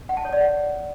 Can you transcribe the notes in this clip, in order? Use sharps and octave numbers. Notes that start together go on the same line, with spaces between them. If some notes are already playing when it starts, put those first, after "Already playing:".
F#5
A5
C#5
D5
F#5